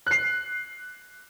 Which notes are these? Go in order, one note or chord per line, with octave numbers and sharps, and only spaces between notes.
F#6 C7